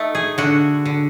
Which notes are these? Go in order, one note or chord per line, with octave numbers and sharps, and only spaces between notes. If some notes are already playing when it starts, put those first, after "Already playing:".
Already playing: A3 D#4
G#4
D3 F#4
D3